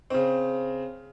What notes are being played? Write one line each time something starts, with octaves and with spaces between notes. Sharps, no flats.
C#3 C4